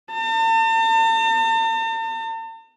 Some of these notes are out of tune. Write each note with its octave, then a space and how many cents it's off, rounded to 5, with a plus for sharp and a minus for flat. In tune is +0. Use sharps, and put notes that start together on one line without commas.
A5 +45